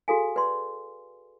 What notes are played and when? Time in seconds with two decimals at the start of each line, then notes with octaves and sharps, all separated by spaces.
0.08 F#4 G#4 A4 F5 G#5
0.36 B4 D5 C6